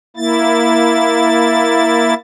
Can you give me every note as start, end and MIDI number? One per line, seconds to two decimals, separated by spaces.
0.17 2.14 58
0.17 2.14 64
0.17 2.14 93